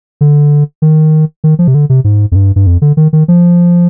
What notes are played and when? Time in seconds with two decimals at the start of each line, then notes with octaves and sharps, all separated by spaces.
0.21 D3
0.82 D#3
1.44 D#3
1.59 F3
1.68 C3
1.75 D3
1.90 C3
2.04 G#2
2.32 F2
2.36 G2
2.56 G2
2.67 F2
2.82 D3
2.97 D#3
3.13 D#3
3.28 F3